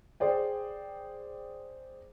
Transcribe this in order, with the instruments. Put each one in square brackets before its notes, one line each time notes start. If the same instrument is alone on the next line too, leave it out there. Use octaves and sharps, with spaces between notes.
[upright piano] G#4 C5 D5 G5